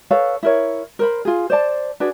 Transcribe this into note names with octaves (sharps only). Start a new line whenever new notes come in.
A4 B4 C#5 F5
E4 A#4 C#5
A#4 C5 B5
F4 G#4
C5 D5 A5
D4 F#4 G#4 B4